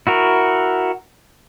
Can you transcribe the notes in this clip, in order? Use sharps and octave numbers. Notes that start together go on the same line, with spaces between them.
E4 F#4 A#4